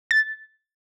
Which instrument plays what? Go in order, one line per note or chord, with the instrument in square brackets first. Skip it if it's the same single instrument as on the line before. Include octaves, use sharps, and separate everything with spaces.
[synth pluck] A6